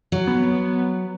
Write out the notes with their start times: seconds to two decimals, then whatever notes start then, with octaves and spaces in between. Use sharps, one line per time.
0.12 F#3
0.27 B3